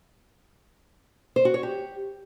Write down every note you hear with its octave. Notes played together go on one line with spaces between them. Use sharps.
C5
F#4
C#5
G4